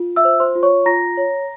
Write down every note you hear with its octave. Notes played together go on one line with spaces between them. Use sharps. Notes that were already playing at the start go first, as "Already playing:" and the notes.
Already playing: F4
E5 E6
C5
C5 C6
F4
C#5 C#6
F4 A#5 A#6
C#5